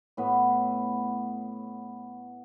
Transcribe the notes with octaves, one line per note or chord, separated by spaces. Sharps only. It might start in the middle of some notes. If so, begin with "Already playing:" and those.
A2 B3